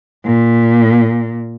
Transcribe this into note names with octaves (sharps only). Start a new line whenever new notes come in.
A#2